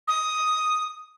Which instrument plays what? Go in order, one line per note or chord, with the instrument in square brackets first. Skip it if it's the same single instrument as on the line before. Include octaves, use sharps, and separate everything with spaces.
[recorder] D#6